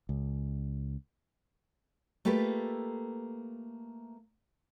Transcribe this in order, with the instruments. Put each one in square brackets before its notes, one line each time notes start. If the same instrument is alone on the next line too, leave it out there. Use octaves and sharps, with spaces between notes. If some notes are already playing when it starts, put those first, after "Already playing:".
[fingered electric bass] C#2
[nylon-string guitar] A3 A#3 F4 G4 A4 B4